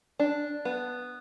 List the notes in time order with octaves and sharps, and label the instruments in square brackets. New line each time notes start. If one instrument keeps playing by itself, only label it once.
[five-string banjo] D4
B3